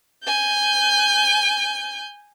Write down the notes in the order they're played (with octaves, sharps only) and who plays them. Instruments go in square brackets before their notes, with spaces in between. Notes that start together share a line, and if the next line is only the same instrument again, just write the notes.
[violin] G#5 G6